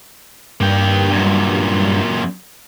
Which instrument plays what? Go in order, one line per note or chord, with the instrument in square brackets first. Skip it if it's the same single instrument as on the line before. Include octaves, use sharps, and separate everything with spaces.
[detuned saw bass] G2 [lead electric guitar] A#3 G5
[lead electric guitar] F#2 A#2